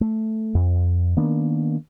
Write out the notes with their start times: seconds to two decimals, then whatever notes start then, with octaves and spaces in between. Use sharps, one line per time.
0.01 A3
0.55 F2
1.17 D#3 A#3 B3 D4